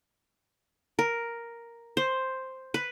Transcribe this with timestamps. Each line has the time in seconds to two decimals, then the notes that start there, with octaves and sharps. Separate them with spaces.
0.99 A#4
1.97 C5
2.74 B4